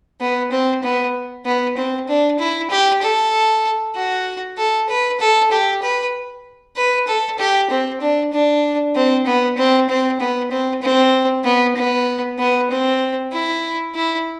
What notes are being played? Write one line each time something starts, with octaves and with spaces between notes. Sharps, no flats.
B3
C4
B3
B3
C4
D4
E4
G4
A4
F#4
A4
B4
A4
G4
B4
B4
A4
G4
C4
D4
D4
C4
B3
C4
C4
B3
C4
C4
B3
B3
B3
C4
E4
E4